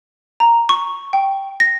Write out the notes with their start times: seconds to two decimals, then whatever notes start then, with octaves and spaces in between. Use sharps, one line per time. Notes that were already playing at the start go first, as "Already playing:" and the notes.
0.40 A#5
0.69 C#6
1.13 G5
1.60 A#6